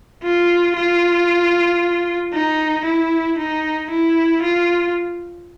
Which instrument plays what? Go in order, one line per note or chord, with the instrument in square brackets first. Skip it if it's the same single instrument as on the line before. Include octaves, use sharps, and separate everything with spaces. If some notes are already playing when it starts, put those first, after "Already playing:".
[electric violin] F4
F4
D#4
E4
D#4
E4
F4